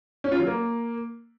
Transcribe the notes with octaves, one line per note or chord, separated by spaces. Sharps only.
C#4
F4
F#3
A#3